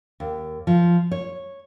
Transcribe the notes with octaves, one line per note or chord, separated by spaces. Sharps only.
D#2
F3
C#5